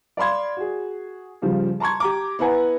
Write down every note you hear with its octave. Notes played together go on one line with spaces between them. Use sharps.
D5 F5 B5 C6 G#6
F#4 G#4
G2 C#3 F3 G3
A5 A#5 C6 C#6 G#6
G4 A#5 D6
B3 E4 B4 F#5 G#5 A#5